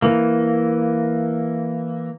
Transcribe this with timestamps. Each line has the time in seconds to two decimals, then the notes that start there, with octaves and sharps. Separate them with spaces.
0.02 E3 A#3